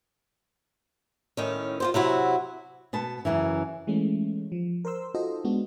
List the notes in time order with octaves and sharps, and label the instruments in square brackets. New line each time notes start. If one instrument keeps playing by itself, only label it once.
[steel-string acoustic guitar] A2 D#3 C#4
F4 G4 C5
C3 F#3 E4 F#4
[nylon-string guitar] B2 B3 A5
F#2 A2 C#3 E3
[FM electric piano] E3 G#3 A3 C#4
F3
A#4 C5 C6 E6
D#4 F4 F#4 A4 C5 D#5
G#3 B3 D4 F#4